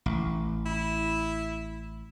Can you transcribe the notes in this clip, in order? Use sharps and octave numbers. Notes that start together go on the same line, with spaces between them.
A1
E4